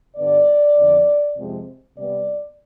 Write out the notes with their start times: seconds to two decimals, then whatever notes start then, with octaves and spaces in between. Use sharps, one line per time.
0.17 G2 D3 G3 B3 D5
0.76 F2 D3 F3 B3
1.36 F2 C3 F3 G#3 C4
1.95 C3 G3 B3 D5